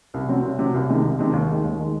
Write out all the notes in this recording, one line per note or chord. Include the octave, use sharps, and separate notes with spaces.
C2
C3 F#3 C4
C2
C3 F#3 C4
C2
C3 D#3 G#3
C2
C3 D#3 G#3
D#2
D#3 G#3
D#2
D#3 G#3